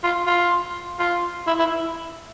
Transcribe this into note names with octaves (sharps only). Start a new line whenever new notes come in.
F4
F4
F4
E4
E4